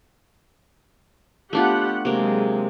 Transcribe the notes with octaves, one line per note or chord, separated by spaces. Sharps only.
A3 B3 D4 F4 G4 F#5
C3 F#3 G#3 A#3